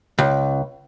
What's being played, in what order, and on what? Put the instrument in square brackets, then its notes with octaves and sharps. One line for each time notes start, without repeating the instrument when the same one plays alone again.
[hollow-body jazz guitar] C#2